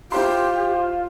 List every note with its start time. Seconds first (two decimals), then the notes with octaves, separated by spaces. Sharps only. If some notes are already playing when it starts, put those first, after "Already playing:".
0.12 E4 F4 G4 C5 C6